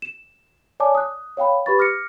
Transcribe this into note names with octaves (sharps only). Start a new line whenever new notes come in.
E7
C#5 D5 G#5 A5 D6
D#6 F#6
C#5 F5 G5 B5
G4 B4 B5 C#6 A6
D6 F6 A#6 C#7